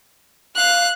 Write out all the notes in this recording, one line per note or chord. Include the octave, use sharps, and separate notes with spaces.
F5 F#6